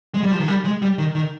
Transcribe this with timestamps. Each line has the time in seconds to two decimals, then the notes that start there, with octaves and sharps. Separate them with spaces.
0.14 G#3
0.23 G3
0.31 F3
0.40 D#3
0.48 G3
0.65 G#3
0.82 G3
0.98 D#3
1.15 D#3